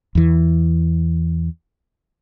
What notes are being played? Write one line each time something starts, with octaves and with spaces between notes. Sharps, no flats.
E2 E3